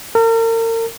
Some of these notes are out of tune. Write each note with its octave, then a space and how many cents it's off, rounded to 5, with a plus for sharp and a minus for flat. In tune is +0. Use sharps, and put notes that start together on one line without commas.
A#4 -40